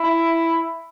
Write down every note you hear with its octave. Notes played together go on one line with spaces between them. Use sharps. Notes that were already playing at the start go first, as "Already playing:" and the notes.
Already playing: E4